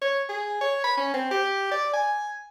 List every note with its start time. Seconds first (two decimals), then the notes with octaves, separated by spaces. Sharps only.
0.01 C#5
0.29 G#4
0.61 C#5
0.84 B5
0.97 C#4
1.14 C4
1.31 G4
1.71 D5
1.93 G#5